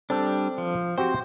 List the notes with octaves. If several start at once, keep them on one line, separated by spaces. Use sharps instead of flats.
G3 C4 D4 A4
F3
C4 F#4 G4 C5